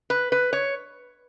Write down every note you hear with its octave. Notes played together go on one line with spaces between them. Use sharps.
B4
B4
C#5